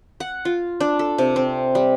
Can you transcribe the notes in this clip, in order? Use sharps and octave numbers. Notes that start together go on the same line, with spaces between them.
F#5
F4
D4
A4
C3
C4
G3